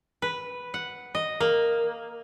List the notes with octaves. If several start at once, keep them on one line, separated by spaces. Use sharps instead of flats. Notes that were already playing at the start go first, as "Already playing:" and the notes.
B4
F#5
D#5
A#3